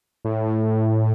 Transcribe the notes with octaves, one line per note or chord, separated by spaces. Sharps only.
A2